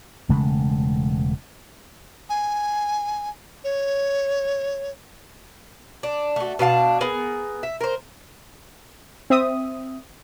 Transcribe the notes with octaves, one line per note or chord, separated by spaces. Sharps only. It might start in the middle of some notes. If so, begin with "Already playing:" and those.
E1 C#3 G#3 A3
G#5
C#5
D4
A3 F#4
B2 D4 F5 A5
B3 G#4 A#4
E5
A#4 C5
C4 E5 D#6